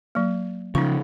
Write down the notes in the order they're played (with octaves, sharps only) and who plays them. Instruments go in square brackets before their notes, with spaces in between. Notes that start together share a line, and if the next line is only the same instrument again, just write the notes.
[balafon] F#3 A#3
[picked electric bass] C#3 F3 [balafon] D#4 C#6